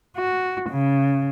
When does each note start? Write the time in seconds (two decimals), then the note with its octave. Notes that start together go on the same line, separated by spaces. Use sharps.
0.16 F#4
0.70 C#3